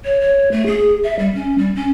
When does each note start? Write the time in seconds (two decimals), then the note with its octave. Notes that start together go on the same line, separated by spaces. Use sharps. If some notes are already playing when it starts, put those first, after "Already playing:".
0.04 C#5
0.21 C#5
0.52 A3
0.66 G#4
1.03 E5
1.19 G3
1.34 C#4
1.58 G3
1.75 C#4